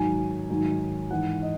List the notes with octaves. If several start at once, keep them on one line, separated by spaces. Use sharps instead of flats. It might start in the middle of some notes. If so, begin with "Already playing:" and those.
Already playing: G#2 D#3 F#3 G#5
G#2 D#3 F#3
G#2 E3 F#5
D#5